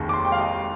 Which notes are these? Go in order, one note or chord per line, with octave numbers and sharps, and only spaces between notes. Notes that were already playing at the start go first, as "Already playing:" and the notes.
Already playing: F1 D#2 D#3 G#3
D6
C6
G5
F5
D#5